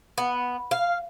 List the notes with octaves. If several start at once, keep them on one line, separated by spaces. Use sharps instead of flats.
B3
F5